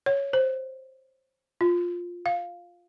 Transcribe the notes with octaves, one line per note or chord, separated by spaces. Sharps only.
C#5
C5
F4
F5